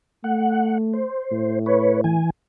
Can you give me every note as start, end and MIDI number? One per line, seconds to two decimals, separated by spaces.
0.24 1.04 57
0.24 0.78 78
0.93 1.59 72
1.31 2.21 45
1.66 2.01 71
1.66 2.01 73
2.04 2.30 52
2.04 2.30 80